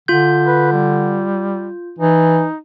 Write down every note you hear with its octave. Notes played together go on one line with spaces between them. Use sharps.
D3 F4 G6
B4
G3
E3 D#4